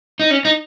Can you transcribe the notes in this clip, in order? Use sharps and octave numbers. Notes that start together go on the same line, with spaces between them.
D#4
C#4
D#4